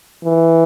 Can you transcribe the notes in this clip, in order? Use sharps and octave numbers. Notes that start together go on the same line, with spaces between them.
E3